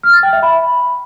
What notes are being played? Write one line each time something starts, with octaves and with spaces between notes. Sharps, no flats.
F6
A6
G5
E5
B5